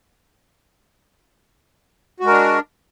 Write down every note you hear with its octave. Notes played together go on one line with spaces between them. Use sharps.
G#3 D4 F#4 A#4